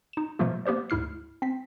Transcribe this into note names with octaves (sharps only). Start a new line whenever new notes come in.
D#4 E7
B2 F3 F#3 A3 A#3 F4
A#3 B3 G4 C5 D5
D2 G#2 E4 F6 C7
C4 B6